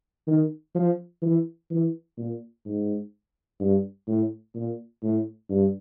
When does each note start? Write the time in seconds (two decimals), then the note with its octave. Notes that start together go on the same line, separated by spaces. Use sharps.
0.27 D#3
0.75 F3
1.22 E3
1.70 E3
2.17 A#2
2.65 G#2
3.60 G2
4.07 A2
4.55 A#2
5.03 A2
5.50 G2